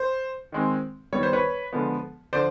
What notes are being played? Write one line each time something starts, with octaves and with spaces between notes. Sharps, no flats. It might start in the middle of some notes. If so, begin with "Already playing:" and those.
Already playing: C5
D#3 G#3 C4
D#3 G3 B3 C#5
C5
B4 C#5
D3 F3 G#3 B3
D3 F3 C5 D5